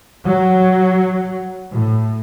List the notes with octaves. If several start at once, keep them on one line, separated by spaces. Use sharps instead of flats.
F#3
A2